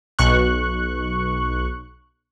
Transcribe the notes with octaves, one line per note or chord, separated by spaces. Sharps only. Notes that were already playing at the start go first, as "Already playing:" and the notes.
B1 C#6 F#6